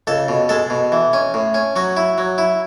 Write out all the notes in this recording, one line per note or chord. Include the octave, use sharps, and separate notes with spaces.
C#2 A4
B2
G#3 A4
B2
E3
C#4
A2
C#4
F#3 F#4
E4
F#3
E4